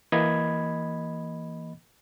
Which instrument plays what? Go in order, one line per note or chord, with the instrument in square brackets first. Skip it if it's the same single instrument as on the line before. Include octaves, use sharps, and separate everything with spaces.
[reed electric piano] E3 A#3 D#5 B5 G#6